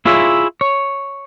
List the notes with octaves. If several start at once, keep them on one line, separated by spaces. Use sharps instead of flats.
E4 F4 G#4 C#5 E5
C#5